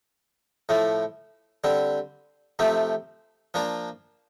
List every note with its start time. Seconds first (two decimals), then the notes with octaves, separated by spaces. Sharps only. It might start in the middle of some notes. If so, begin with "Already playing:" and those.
0.69 A2 F3 A3
1.64 D3 G3 C4
2.59 C3 F3 A3 C4
3.54 F3 A#3 D4 F4